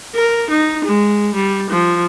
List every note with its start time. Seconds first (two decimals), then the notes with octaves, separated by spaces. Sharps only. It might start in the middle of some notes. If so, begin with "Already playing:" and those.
0.15 A#4
0.50 D#4
0.84 G#3
1.34 G3
1.70 F3